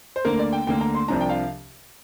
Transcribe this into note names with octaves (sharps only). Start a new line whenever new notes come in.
C5
D2 D3 A#3 A#4
D5
G5
D2 D3 A#3 G5
A#5
C6
C2 C3 F3 D4 A#5
G5
F5